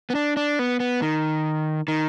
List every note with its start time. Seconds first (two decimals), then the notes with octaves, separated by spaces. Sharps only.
0.10 B3
0.15 D4
0.37 D4
0.59 B3
0.80 B3
1.02 D#3
1.88 D#3